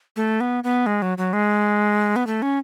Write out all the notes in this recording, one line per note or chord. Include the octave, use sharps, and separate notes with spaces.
A3
B3
B3
G#3
F#3
F#3
G#3
B3
A3
C#4